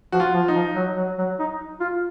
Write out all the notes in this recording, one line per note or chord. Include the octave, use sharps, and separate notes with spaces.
F3 F#4
F4
F3
D#4
F3
F#3
F#3
F#3
D#4
F4